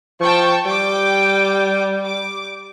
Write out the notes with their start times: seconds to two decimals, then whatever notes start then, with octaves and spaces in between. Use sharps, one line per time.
0.20 F3 G5 A5 C#6
0.65 G3 G5 D6
2.05 D6